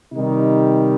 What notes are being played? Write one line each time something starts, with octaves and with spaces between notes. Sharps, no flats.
C3 D#3 G3 D#4